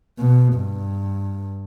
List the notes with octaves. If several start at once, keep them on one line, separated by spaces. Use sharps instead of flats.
B2
G2